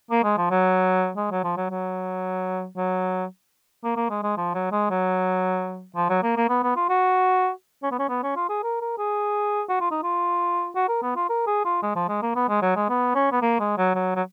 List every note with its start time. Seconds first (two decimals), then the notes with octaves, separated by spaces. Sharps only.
0.11 A#3
0.24 G#3
0.38 F3
0.51 F#3
1.17 G#3
1.31 F#3
1.44 F3
1.57 F#3
1.70 F#3
2.77 F#3
3.84 A#3
3.96 A#3
4.10 G#3
4.23 G#3
4.37 F3
4.54 F#3
4.72 G#3
4.90 F#3
5.96 F3
6.10 F#3
6.23 A#3
6.37 A#3
6.49 B3
6.63 B3
6.76 F4
6.89 F#4
7.83 C#4
7.91 B3
7.99 C#4
8.09 B3
8.23 C#4
8.36 F4
8.49 G#4
8.63 A#4
8.81 A#4
8.98 G#4
9.69 F#4
9.81 F4
9.91 D#4
10.03 F4
10.76 F#4
10.88 A#4
11.02 B3
11.16 F4
11.29 A#4
11.47 G#4
11.65 F4
11.83 G#3
11.95 F3
12.08 G#3
12.22 A#3
12.36 B3
12.49 G#3
12.62 F#3
12.76 G#3
12.89 B3
13.15 C#4
13.32 B3
13.42 A#3
13.59 G#3
13.78 F#3
13.95 F#3
14.16 F#3